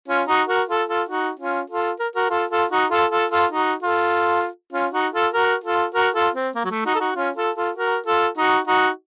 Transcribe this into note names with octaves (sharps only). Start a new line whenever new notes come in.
C#4 F4
D#4 F#4
F#4 A#4
F4 A4
F4 A4
D#4 F#4
C#4 F4
F4 A4
A#4
F#4 A#4
F4 A4
F4 A4
D#4 F#4
F4 A4
F4 A4
F4 A4
D#4 F#4
F4 A4
C#4 F4
D#4 F#4
F4 A4
F#4 A#4
F4 A4
F#4 A#4
F4 A4
C4
A#3
F#3
A3
D#4 F#4
A4
D#4 F#4
C#4 F4
F4 A4
F4 A4
F#4 A#4
F4 A4
D#4 F#4
D#4 F#4